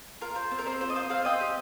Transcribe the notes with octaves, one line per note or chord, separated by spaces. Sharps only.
F4 A#4
F4 C5
C4 C5
A#4
C4 C5
F4 C5
D#5
F4 C5 F5
C4 C5 F5
C4 D#5 G5
G4